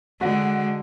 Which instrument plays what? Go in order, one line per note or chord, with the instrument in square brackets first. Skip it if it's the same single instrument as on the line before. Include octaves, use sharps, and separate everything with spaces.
[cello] D3 G#3 [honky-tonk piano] F#4